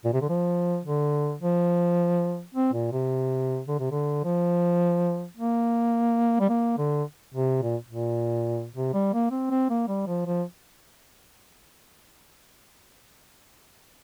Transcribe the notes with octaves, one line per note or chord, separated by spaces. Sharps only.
A#2
C3
D3
F3
D3
F3
C4
A#2
C3
D3
C3
D3
F3
A#3
G3
A#3
D3
C3
A#2
A#2
C3
G3
A#3
C4
C4
A#3
G3
F3
F3